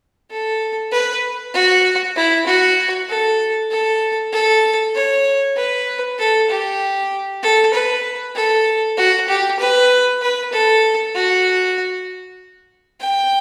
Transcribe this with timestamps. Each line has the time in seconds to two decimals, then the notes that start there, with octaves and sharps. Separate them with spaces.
0.31 A4
0.92 B4
1.54 F#4
2.16 E4
2.46 F#4
3.09 A4
3.71 A4
4.32 A4
4.95 C#5
5.56 B4
6.19 A4
6.50 G4
7.43 A4
7.73 B4
8.35 A4
8.97 F#4
9.28 G4
9.59 B4
10.22 B4
10.52 A4
11.15 F#4
13.01 G5